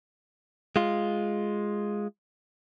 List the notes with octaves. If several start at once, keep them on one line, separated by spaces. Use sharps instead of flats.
G#3 F4